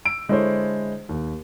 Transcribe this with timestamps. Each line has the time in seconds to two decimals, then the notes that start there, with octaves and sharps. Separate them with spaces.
0.05 E6 D7
0.28 D3 G#3 E4 A4 C5 C#5
1.09 D#2